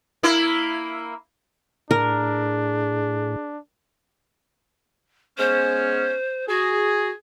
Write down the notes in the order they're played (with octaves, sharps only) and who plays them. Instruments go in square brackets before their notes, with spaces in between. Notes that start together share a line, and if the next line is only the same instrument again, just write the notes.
[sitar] A#3 E4
[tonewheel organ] A2 [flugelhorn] D4 [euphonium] G#4 [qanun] A#4
[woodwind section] G#3 B3 C#4 [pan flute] C5
[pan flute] F#4 [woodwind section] G#4